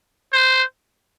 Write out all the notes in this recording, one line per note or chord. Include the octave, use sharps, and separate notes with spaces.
C5